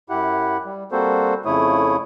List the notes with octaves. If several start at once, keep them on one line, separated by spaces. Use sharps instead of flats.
F#2 E4 G4 F#5
G3
G3 A#3 C4 F#4 A4 C5
F2 C#3 A3 E4 C#5 D#6